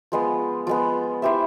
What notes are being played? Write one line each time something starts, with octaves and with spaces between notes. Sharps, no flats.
F3 G#3 B3
F3 G#3 B3
E4 G4 C5 E5